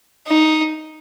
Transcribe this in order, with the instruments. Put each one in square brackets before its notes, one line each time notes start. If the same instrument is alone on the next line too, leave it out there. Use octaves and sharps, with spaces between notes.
[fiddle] D#4